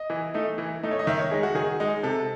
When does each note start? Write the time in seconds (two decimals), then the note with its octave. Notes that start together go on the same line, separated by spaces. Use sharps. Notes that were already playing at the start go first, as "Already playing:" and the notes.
Already playing: D#5
0.10 E3
0.34 A3 D#4
0.58 E3
0.83 A3 D#4
0.91 C#5
0.99 D#5
1.07 D#3 E5
1.19 C#5
1.31 G#3 D#4 G#4
1.43 F#4
1.55 D#3 G#4
1.80 G#3 D#4
2.03 C3 A4